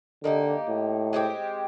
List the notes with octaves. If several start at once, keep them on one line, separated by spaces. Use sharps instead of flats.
D3 A#3 D#4 G4
A2
G#3 C4 E4 G4